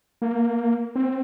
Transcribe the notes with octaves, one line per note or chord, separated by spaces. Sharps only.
A#3
C4